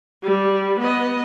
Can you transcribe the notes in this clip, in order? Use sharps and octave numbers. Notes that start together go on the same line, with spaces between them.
G3
B3 D#5